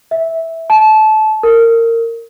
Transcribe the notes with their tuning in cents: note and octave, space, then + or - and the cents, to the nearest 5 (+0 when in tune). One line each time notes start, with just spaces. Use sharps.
E5 -10
A5 -25
A#4 -25